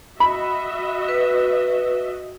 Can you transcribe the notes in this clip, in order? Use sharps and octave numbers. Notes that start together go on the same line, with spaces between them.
F#4 D#5 E5 B5
B4